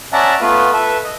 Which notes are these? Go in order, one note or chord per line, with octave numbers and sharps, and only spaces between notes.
C#4 D5 E5 F#5 A5 A#5
A3 B3 F4 B4
A4 B4 E5
D#5